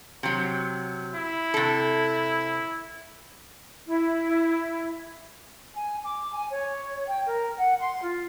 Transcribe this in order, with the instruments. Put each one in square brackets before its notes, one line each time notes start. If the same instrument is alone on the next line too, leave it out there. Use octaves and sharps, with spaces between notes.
[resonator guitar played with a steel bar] C3 F#3
[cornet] E4
[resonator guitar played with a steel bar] C3 A4
[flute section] E4
G#5
D6
G#5
C#5
G5
A#4
F#5
C6
F4